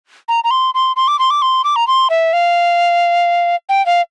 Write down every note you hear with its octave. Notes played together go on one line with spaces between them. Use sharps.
A#5
A#5
C6
C6
C6
D6
C6
D6
C6
D6
A#5
C6
E5
F5
G5
F5